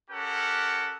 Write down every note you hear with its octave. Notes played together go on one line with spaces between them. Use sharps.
C#4 G4 A4 A#4 F#5